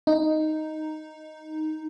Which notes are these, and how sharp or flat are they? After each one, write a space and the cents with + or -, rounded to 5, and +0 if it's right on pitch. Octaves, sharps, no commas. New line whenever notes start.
D#4 +0